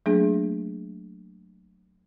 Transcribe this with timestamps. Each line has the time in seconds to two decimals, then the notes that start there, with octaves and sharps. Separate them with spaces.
0.06 F#3 A3 A#3 D4 G#4